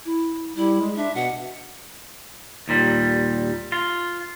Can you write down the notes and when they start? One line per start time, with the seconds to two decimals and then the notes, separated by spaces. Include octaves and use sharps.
0.05 E4
0.55 G3 E4
0.80 G#3
0.96 D4 E5
1.15 B2 F#5
2.68 D#2 A#2 G3
3.72 F4